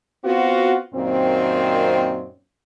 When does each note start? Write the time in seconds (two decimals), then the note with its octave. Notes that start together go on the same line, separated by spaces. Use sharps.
0.24 B3 C4 F4 F#4
0.95 F#2 A#2 D#3 C4